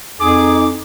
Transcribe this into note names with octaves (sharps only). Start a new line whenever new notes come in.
F2 D#4 G#4 D6